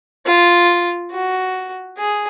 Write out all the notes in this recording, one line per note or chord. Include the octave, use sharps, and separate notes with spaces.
F4
F#4
G#4